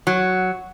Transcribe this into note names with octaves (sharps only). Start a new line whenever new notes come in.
F#3